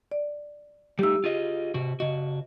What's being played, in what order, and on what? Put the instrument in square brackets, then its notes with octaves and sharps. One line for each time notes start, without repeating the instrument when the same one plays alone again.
[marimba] D5
[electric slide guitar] G3 A3 D#4 [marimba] G4 E6
[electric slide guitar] F4 G#4 D#5
C3 F#4
[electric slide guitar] C#3 F#4 [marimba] D#5